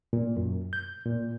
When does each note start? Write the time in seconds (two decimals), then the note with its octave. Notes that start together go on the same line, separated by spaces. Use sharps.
0.13 A#2
0.37 F#2
0.73 G6
1.06 A#2